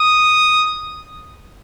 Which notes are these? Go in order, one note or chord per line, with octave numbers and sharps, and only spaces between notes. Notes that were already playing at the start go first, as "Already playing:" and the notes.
Already playing: D#6